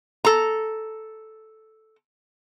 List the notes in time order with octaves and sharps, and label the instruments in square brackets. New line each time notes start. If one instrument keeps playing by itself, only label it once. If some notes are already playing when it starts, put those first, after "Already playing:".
[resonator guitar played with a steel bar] A4 A#5